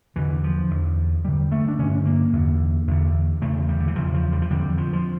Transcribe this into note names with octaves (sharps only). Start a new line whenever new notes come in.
E2 D3 E3
F3
E2 D3
G2 D3 G3
A3
D4
G2 D3 C#4
A#3
E2 D3
E2 D3
E2 C#3 A3
G3
D3
E3
E2 C#3 F3
F3
G3
F3
F2 D3 G3
F3
F3